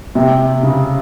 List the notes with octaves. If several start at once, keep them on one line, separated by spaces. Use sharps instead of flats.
C3
C#3